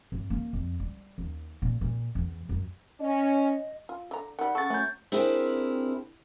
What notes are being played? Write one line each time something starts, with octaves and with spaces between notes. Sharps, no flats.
G2
A#3
F2
G3
D#2
A#2
A#2
E2
F#2
C#4 D#5
F4
D3 A#5
D#3 G3 F#5
C#3 A4 C#6 A6
F#3 A3 C#4 G6
C4 D4 E4 G4 G#4 A#4